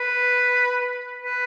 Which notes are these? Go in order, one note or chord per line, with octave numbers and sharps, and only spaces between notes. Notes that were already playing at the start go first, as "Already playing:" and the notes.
Already playing: B4
B4